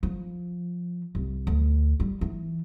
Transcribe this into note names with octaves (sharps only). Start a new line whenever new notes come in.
F3
C2
D2
G3
E3